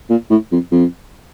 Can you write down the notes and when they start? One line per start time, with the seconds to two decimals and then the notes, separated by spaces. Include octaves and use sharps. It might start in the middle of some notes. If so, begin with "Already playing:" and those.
0.10 A#2
0.30 A2
0.52 F2
0.72 F2